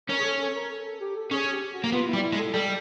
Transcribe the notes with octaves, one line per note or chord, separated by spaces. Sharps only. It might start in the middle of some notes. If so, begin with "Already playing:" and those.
C#4 A#4
G#4
A4
A4
A#4
A4
A4
G4
A4
C#4 G#4
G4
F#4
A#3
B3 F4
E4
G3
E4
G#3
A4
G3 A4